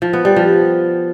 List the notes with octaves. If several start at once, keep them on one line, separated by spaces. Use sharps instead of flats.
F3
B3
G3
F3